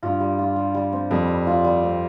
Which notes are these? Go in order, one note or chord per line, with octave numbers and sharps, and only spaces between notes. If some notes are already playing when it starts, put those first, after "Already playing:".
G2 F4
G3
F4
G3
G3
C4
F2 G3
G3
F4
G3
C4